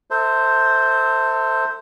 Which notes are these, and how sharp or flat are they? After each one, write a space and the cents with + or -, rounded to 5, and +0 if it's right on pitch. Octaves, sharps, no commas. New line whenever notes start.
A4 +30 C5 +0 E5 -20